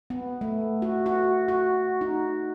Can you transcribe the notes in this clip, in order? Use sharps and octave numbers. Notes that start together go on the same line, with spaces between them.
B3
A3
F#4
F#4
F#4
D#4